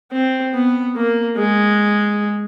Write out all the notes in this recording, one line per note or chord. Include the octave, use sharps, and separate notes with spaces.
C4
B3
A#3
G#3